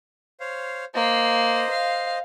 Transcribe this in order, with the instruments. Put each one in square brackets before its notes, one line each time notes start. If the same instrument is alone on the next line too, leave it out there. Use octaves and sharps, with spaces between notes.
[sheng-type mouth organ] C5 C#5 F5
[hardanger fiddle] A#3 [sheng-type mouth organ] C5 D#5
[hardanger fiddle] F5